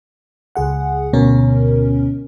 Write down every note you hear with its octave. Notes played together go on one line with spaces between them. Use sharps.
C#2 G#4 F#5
D2 B2 C#4 A#4